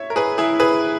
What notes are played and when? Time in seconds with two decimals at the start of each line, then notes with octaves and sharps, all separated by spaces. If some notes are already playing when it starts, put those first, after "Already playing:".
Already playing: C#5 E5
0.10 A#4
0.16 G#4 B4
0.38 E4 G#4
0.60 G#4 B4